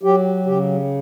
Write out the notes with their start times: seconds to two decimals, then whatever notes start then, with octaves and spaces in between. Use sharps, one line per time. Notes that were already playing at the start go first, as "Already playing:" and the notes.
0.03 F#3 G4
0.46 C#3 G4